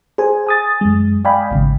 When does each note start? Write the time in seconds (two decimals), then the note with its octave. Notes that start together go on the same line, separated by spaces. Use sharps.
0.18 G#4 C5 G#5
0.47 G#5 D#6 A6
0.81 F#2 G#3
1.25 D5 D#5 F5 G5 G#5 B5
1.51 G#1 G#2 C#3